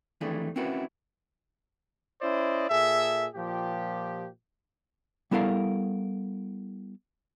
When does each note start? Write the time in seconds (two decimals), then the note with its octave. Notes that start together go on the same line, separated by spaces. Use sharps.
0.21 F2 D#3 E3 A3 D4 G#4
0.56 C4 C#4 E4 F#4 A#4 B4
2.22 C#4 E4 C5 D5 D#5
2.69 A#2 G#4 A4 E5
3.35 A#2 F3 G4
5.31 G3 B3 E4 A4 A#4 F5